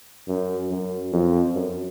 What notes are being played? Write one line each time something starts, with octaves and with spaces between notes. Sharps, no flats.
F#2
F#2
F2
F#2